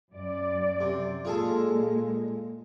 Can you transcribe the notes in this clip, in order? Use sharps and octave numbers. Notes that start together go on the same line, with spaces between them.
F#2 D5
C3
A#2 G#3 F4 G#4 A4